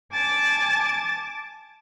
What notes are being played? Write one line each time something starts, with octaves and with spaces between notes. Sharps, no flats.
G#5 A5 D6 A6